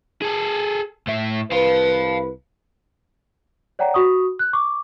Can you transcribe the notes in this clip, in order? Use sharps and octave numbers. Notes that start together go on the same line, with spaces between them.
G#4 A4
A2 E5
C2 B4 F5 A5
C#5 D5 F#5 G5 A#5
F#4 C#6 D#6
F#6
C#6 D6